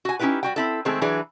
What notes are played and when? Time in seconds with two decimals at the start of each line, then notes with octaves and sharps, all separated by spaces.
0.05 F#4 G#5
0.19 C#4 D#4 E4 G4 B4
0.43 G3 F#4 G5
0.56 C4 E4 A4
0.85 D#3 G#3 A3 C4 G#4 A4
1.02 E3 F#3 D4 G#4 B4